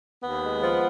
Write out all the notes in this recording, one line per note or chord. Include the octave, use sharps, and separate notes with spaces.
D#2 B3
G#3
F3